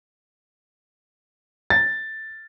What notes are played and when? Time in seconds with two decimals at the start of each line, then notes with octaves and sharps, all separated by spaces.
1.70 A6